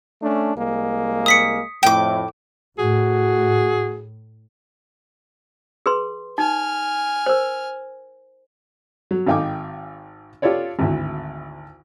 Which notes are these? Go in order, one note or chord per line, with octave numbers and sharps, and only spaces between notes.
A3 C#4 D4
C2 G#3 A#3
D#6 B6 C#7
F2 A2 G5 D6
A2 F#4 G#4
G#4 B4 C6
D#4 G#5 F6
A#4 C5
F#3
G#1 D#4 F5 G5 G#5 D6
F4 G4 A4 C#5 D5
G#1 D2 E4